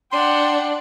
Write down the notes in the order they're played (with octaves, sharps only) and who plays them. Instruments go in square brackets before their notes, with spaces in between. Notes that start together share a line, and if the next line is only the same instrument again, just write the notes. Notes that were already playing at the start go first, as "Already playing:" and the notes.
[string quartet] D4 [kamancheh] F#5 G5 [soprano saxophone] C6